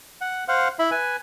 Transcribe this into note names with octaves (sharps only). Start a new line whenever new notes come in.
F#5
C5 F5 F#5
E4 E5 B5
B4 G#5